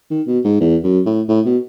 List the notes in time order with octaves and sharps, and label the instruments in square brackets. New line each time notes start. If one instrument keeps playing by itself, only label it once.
[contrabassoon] D#3
B2
G#2
E2
F#2
A2
A2
B2